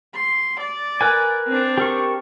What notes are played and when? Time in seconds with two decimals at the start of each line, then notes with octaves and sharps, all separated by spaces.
0.15 C6
0.60 D5
1.01 A#4 B4 G#5
1.48 C4 D4
1.78 G4 A#4 C#6